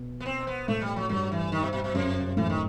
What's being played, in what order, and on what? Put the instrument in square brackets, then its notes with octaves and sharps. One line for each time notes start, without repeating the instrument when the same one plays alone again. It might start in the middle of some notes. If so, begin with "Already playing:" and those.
Already playing: [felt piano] B2
[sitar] B3
C4
B3
[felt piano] A2 [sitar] A3
[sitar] G3
F#3
[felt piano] G2 [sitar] F#3
[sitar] E3
D#3
B2
B2
B2
[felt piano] F#2 [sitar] C3
[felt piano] A2 [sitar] E3
[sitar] D#3